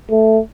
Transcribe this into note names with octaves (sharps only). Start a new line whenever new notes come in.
A3